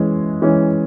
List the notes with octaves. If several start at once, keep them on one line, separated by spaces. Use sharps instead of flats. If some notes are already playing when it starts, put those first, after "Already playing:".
Already playing: E3 G#3 C#4
E3 G#3 C#4